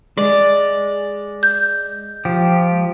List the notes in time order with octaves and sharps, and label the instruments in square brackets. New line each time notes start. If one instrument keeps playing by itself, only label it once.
[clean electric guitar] G#3 [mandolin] D5
[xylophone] G6
[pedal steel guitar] F3 G4